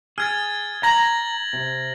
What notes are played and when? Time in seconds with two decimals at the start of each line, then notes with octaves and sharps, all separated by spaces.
0.18 G#4 F6 G#6 A6
0.83 A#5 G#6 A#6 F#7
1.53 C3